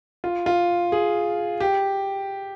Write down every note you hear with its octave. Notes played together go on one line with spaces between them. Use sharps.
F4
F4
G#4
G4